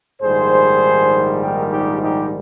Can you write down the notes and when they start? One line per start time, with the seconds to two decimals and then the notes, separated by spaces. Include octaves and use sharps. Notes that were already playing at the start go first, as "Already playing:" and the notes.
0.21 A#1 G#2 D#3 G3 G#4 C5
1.42 G4 A#4
1.71 D#4 G4
2.02 D#4 G4